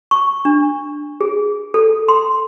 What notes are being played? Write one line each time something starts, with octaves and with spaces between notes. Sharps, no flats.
C#6
D4
G#4
A4
C6